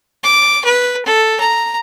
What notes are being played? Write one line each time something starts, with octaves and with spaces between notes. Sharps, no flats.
D6
B4
A4
A#5